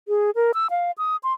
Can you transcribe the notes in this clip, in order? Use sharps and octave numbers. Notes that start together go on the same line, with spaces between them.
G#4
A#4
E6
F5
D#6
C6